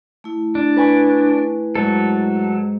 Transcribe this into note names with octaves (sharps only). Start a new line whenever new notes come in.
A3 E4
D4
B4 G#5 C#6
G#2 F#3 A4